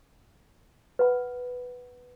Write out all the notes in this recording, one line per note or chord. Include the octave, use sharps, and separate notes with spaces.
B4 F#5 B5